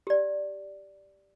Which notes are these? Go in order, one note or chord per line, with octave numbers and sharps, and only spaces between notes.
G4 D5